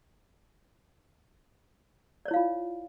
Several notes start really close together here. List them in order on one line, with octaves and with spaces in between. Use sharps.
D5 C#5 E4 F5 F4